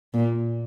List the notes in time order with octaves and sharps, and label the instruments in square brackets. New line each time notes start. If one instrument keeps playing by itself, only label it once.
[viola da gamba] A#2